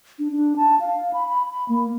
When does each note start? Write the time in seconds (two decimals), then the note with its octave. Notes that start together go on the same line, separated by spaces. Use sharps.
0.19 D4
0.32 D4
0.56 A5
0.80 F5
1.13 B5
1.28 B5
1.49 B5
1.69 A#3